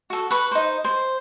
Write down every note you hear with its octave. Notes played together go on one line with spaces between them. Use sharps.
F#4 A4
B4 C#6
D#4 C5
C5